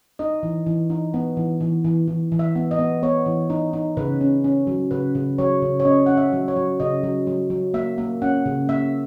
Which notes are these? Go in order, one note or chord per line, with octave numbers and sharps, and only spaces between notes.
D#4 D#5
E3
E3
D#4
B3
E3
E3
E3
E3
E3
E5
B3
D#5
B3
B3 C#5
E3
D#4
D#4
C#3 B4
C#4
C#4
F#3
C#3 B4
C#3
F#3 C#5
C#3
C#5
C#4 D#5
C#4 F#5
E5
F#3
C#5
F#3
C#3 D#5
F#3
F#3
F#3
A#3 E5
A#3
C#4 F#5
C#3
A#3 E5